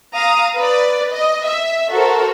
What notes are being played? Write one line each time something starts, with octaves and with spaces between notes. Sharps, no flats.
F5 A#5 D#6
B4 D5
D#5
E5
F#4 A4 A#4 C5